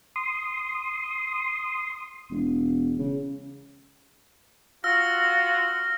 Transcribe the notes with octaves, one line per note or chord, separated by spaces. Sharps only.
C6 D#6
E1
C#3
F4 F#4 E6 F6 A#6